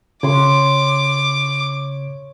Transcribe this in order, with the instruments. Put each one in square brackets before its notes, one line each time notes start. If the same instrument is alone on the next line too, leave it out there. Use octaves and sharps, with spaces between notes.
[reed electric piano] C#3 [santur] C#5 C6 [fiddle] D6